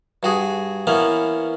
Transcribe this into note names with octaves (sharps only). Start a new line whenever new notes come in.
G2 F#4 G#4
E3 A#3 B3 C#4